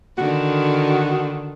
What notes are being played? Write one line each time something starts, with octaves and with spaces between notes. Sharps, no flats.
D3 D#3 F#4